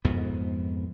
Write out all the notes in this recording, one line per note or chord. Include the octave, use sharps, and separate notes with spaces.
F2 G#2 B3